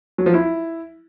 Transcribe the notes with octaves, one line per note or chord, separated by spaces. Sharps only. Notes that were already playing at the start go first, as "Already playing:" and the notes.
F#3
F3
E4